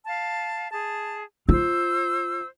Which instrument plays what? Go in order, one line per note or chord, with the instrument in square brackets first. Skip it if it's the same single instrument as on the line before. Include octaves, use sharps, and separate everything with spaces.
[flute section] F5 A5
G#4 A5
[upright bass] F4 [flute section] C5 E6